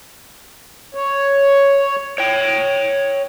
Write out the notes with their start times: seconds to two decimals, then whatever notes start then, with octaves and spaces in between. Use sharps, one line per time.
0.95 C#5
2.18 C#5 G5